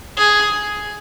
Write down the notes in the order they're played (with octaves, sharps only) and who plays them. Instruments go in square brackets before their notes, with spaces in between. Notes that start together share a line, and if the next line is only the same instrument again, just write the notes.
[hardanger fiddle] G#4